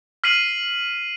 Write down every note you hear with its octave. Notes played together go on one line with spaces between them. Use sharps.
F6 B6 C7 D#7 F#7